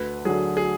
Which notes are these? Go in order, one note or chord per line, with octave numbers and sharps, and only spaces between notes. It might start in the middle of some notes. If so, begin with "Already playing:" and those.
Already playing: D2 B4
D3 F#3 G#4
G#4